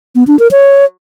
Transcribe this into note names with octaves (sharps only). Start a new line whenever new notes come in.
B3
D4
A#4
C#5